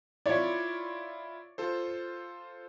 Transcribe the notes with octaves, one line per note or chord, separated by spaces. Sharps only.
E4 F4 C#5 D5
F4 A4 C5